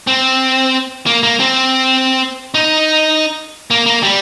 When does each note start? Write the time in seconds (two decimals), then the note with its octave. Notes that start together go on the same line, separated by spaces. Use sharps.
0.07 C4
1.06 A#3
1.23 A#3
1.40 C4
2.54 D#4
3.71 A#3
3.86 A#3
4.03 G3